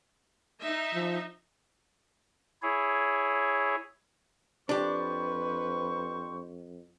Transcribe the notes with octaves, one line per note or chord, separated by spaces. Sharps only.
D#4 E5
F3
E4 G#4 C#5
F2 G3 D4 G4 B4 C5 C#6